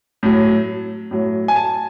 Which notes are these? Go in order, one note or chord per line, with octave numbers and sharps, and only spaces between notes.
A2 F#3
A2 F#3
G#5
A5